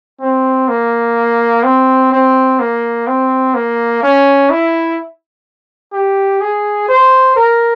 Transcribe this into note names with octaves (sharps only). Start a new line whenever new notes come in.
C4
A#3
C4
C4
A#3
C4
A#3
C#4
E4
G4
G#4
C5
A#4